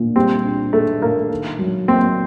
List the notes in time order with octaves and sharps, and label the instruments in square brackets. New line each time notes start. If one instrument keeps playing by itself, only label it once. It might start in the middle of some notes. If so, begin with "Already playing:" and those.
Already playing: [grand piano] A#2 D4
[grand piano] G3 [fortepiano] C4
[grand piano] D4
[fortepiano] A3 [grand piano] A4
[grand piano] A#2 [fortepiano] A#3
[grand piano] D#3
F#3
[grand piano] A#3 [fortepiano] C4